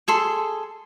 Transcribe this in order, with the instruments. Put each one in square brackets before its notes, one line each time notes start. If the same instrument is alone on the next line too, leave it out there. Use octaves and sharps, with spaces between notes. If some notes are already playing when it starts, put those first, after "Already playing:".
[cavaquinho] G#4 A4 C6